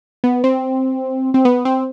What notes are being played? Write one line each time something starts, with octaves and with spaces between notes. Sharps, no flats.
B3
C4
C4
B3
C4